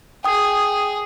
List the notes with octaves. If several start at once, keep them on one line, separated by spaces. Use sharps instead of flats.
G#4 G5 D#6